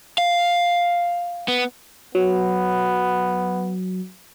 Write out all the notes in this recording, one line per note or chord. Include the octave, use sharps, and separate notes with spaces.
F5
B3
F#3 B3